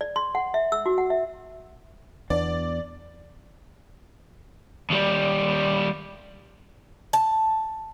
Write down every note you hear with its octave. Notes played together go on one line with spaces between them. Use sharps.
D5
C6
F#5
E5
E6
F#4
F#5
E5
E2 B3 D4 D5
D#2 G3
A5